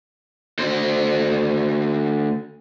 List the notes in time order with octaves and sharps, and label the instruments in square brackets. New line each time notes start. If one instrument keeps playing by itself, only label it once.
[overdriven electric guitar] D2 C5